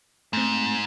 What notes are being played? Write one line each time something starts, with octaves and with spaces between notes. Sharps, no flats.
G#2 A3 C4